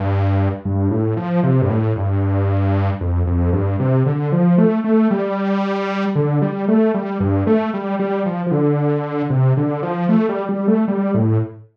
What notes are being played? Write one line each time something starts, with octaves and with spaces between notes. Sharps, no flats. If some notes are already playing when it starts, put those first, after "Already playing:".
Already playing: G2
G2
A2
F3
C3
G2
A2
G2
F2
F2
G2
C3
D3
F3
A3
A3
G3
D3
G3
A3
G3
G2
A3
G3
G3
F3
F3
D3
C3
D3
F3
A3
G3
G3
A3
G3
A2